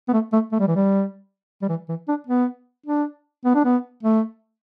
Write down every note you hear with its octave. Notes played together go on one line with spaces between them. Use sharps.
B3
A3
A3
A3
G3
E3
G3
G3
E3
E3
D4
B3
D4
B3
D4
B3
A3